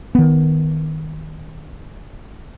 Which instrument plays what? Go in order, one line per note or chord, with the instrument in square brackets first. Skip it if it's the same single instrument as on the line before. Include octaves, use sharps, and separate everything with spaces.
[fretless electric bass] D#3 B3